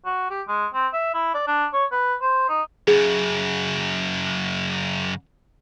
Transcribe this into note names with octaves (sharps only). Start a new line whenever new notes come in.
F#4
G4
G#3
C4
E5
E4
D5
D4
C#5
B4
C5
D#4
F#2 C#3 G#4